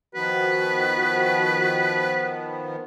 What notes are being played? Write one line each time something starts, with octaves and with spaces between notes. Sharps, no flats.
D#3 F3 B3 F#4 B4